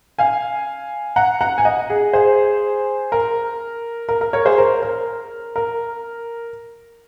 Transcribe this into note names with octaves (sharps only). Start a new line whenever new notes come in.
F5 G#5
F#5 A#5
F#5 A#5
G#5
D#5 F#5
G#4
G#4 C5
A#4
A#4
A#4
A#4 C#5
G#4 C5
A#4
A#4
A#4